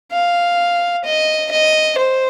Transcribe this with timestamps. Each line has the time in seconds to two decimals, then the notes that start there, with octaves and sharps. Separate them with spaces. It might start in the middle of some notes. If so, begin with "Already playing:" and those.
0.12 F5
1.05 D#5
1.52 D#5
1.98 C5